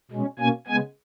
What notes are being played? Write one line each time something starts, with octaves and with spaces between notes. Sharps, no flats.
B2 G#3 C#4
B2 A#3 C#4 G#5
C#3 G#3 B3 G#5